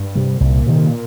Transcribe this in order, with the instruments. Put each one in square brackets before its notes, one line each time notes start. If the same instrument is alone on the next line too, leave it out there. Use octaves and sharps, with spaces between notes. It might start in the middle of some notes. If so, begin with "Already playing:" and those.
Already playing: [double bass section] G2
[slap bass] C3 G3
[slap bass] C2 [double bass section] A#2
[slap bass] C3 D#3